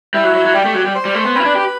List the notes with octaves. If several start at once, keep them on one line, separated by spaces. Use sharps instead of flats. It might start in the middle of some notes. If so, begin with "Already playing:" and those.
G3 E4 E5
F#3
F#3
F#3
G3 G4 G5
A3
F#3
G3
C5 C6
G3
A3
B3
C4 E4 B4 B5
D4
G4